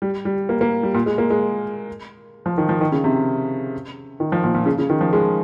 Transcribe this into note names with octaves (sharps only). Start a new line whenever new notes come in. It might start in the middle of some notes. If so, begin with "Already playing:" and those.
G3
G3
A#3
A#3
G3
A#2
G#3
A#3
G#3
F3
D#3
F3
D#3
C#3
C3
D#3
F3
A#2
A#2
C#3
C#3
D#3
F3
G#3